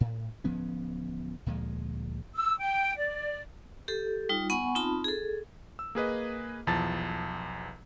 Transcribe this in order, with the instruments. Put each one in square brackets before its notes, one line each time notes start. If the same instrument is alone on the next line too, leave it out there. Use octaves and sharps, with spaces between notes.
[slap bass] A2
D1 F3 B3 C#4
D2 A#2 F3 G#3
[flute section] E6
G5
D5
[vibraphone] G4 A4
G3 D#4 F4
B3 F#5 G#5 B5 C#6
C4 D#4 F4 A5 B5
G#4 A4
[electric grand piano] E6
A#3 G#4 B4 D#5
B1 E2 F3 A5 A6